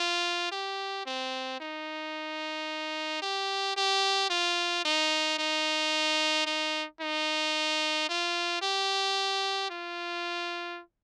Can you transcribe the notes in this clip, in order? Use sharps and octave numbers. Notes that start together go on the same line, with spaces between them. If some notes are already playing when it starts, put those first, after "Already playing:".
Already playing: F4
G4
C4
D#4
G4
G4
F4
D#4
D#4
D#4
D#4
F4
G4
F4